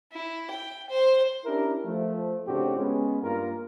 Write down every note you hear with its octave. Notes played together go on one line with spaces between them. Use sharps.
E4
G5
C5
C#4 D4 E4 G4 A#4
F3 A3
A2 C#3 C4 D4 F#4 G4
G#3 B3 C#4
G2 A#3 F4 A#4